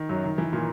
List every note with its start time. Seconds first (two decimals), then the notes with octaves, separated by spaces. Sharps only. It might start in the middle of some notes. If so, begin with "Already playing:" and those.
Already playing: D#3
0.09 F#2 F#3
0.24 D#3
0.38 E3
0.53 A#2 A#3